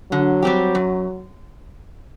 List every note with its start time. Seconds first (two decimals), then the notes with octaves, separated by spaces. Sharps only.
0.12 D3 F#3
0.42 G3 C4 G4
0.75 F#2